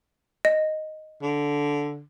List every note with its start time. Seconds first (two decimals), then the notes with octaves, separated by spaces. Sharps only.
0.45 D#5
1.23 D3